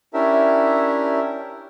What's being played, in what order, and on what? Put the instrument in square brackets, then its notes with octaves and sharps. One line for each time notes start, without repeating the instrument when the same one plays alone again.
[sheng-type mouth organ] C#4 D4 E4 G4 A#4 E5